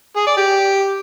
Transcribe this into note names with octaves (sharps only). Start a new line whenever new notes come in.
G#4
D5
G4